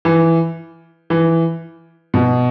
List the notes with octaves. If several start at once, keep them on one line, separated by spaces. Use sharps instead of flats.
E3
E3
B2